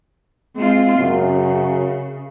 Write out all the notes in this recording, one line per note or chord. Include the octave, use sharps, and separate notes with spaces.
G#3 C4 F4
F#2 C#3